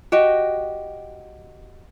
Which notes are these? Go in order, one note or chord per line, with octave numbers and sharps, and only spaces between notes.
F#4 G4 D#5 G5